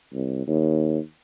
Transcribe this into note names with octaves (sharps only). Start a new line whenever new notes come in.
C2
D#2